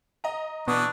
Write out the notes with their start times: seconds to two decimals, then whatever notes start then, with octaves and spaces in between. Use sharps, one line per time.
0.24 D#5 A#5
0.68 B2 E3 D4 C#6 D#6